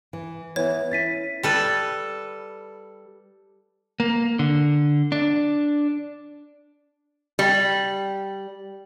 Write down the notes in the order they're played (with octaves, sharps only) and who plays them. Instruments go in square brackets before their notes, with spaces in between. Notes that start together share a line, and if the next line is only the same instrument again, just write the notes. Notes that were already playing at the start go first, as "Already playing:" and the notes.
[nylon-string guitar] E3
[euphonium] E3 [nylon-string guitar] B3 [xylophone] C#5
[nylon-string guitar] C#4 [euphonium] E4 [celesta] A6 B6 D#7
[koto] G3 A4 B4
[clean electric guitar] A#3
D3
D4
[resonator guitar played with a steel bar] G3